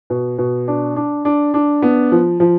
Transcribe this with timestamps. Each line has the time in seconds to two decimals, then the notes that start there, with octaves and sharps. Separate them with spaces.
0.10 B2
0.38 B2
0.68 D4
0.96 D4
1.25 D4
1.54 D4
1.82 B3
2.12 F3
2.40 F3